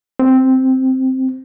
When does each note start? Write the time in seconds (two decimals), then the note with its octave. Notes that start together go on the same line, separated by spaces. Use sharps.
0.19 C4